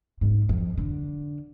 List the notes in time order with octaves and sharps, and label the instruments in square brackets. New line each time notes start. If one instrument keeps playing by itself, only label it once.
[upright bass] G#2
F2
D3